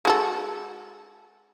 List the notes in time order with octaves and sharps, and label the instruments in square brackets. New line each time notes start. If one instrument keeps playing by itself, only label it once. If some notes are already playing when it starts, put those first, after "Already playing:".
[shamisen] G#3 F#4 A4